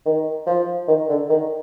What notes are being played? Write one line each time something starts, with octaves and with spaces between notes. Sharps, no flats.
D#3
F3
D#3
D3
D#3